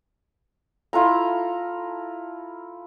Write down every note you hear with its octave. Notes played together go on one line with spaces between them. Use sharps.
E4 F4 A4 A#5